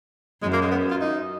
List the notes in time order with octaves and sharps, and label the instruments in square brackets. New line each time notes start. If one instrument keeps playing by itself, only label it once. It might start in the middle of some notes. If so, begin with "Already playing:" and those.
[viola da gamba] F#2 [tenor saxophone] G#3
[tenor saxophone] A#3
G#3
B3
F4
D#4